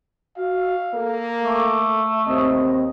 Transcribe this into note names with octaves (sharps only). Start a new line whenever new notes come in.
F#4 F5
A#3 A4
A3 D6
D#2 C4 D#5